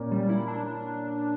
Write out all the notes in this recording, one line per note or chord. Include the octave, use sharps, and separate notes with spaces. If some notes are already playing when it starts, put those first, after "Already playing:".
Already playing: A#2 A#3 C#4
G3
E4
D4